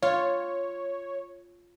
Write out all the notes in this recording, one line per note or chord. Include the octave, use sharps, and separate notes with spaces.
F4 C#5